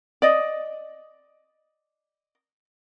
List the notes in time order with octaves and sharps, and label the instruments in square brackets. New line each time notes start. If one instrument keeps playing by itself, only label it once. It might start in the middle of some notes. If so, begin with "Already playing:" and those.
[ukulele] D5 D#5